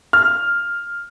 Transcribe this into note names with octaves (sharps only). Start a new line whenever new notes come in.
F6